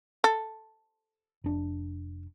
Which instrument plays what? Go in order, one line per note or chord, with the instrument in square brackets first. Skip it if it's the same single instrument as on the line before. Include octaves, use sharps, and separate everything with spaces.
[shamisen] A4
[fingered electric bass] F1 D4